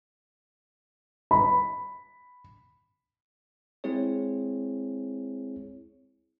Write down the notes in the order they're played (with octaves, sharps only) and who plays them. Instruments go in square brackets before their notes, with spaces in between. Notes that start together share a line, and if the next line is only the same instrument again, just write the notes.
[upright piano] B5
[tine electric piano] G#3 C4 E4 G#4 C#5